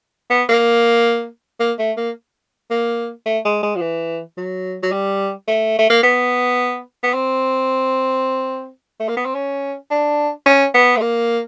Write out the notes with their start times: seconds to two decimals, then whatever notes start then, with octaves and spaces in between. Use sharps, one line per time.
0.31 B3
0.49 A#3
1.60 A#3
1.79 A3
1.97 A#3
2.71 A#3
3.26 A3
3.45 G#3
3.63 G#3
3.76 F3
3.81 E3
4.37 F#3
4.83 F#3
4.92 G3
5.48 A3
5.79 A3
5.90 A#3
6.03 B3
7.03 B3
7.14 C4
9.00 A3
9.09 A#3
9.17 B3
9.26 C4
9.35 C#4
9.91 D4
10.46 C#4
10.74 B3
10.97 A3
11.01 A#3